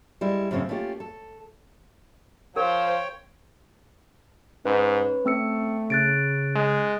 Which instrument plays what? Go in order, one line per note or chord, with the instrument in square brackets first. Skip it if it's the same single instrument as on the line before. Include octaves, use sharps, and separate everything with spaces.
[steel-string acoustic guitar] G3 G#3 E4
F#2 A2 C#3 C4 C#4
A3 A#3 C#4 E4 F4 G4
A4
[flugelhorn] F3 [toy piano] A#4 [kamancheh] C5 [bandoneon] C#5 G5
[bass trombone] G#2 [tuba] C#4 [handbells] B4
[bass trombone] A3 [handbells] C4 E6 C#7
[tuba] C#3 [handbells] F#6 A6 D7
[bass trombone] G#3